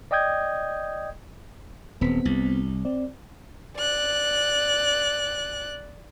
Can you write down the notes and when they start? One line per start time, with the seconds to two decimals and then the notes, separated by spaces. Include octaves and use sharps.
0.11 D5 D#5 G5 D#6 G6 G#6
2.01 D#1 B3 C4 B6
2.25 C2
2.85 C4 D5
3.77 D5 F#6